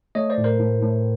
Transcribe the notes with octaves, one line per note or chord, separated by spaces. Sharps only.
A3 C#5 D#5
C5 D5
A2
A#4 C5
A2
A2